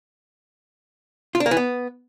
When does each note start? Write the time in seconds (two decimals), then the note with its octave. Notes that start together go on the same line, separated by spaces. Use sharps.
1.35 F4
1.40 D4
1.46 A#3
1.51 E3
1.57 B3